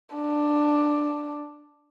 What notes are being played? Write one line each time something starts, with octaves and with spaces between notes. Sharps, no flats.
D4